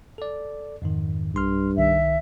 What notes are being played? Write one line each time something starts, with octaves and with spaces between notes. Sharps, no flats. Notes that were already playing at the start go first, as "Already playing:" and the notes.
A4 D5
F2 G#2 D#3
B1 G2 C6 F6
C2 D#3 E5